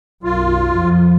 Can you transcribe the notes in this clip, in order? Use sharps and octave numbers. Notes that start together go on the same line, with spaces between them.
B1 F#2 F4
F2 F3